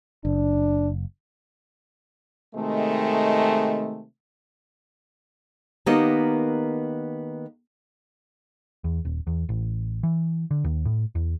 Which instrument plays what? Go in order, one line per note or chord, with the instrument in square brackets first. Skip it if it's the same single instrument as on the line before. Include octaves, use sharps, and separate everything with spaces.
[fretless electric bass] F#1 [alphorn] D4
[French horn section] C3 D#3 G#3 A3
[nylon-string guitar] D#3 A#3 B3 G4 A#4 D#5
[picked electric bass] E2
D#1
E2
A1
E3
D3
D#2
A2
E2